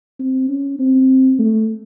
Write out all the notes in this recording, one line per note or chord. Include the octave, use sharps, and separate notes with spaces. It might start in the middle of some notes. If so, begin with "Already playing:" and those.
C4
C#4
C4
A3